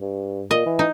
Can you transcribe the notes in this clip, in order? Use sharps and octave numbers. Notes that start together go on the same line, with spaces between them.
G2
A#2 D#5
E3
D#4